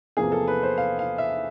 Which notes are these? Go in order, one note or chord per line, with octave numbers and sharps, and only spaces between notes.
E2 C3 F3 A#3 G#4
A4
B4
C5
F5
F5
E5